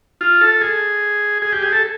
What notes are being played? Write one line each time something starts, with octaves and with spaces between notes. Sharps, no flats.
F4
A4
G#4
G#4
G4
G#4
A4